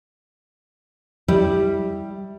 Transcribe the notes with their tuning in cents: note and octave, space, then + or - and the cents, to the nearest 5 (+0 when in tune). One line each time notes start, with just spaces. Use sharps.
G3 +0 E4 -15